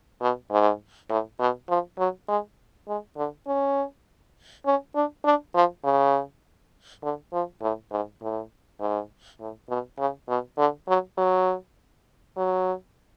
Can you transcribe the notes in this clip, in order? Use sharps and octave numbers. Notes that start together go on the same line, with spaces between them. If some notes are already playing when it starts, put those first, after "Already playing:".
B2
G#2
A2
B2
F3
F#3
G#3
G#3
D3
C#4
C#4
D4
D4
F3
C#3
D3
F3
A2
G#2
A2
G#2
A2
B2
C#3
B2
D3
F#3
F#3
F#3